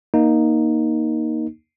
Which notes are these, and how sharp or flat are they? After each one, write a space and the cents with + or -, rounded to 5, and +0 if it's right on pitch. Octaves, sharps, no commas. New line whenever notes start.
A#3 +10 D#4 +0